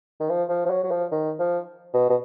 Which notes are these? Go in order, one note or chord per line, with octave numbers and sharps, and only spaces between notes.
D#3
F3
F3
F3
F#3
F#3
F3
D#3
F3
B2
B2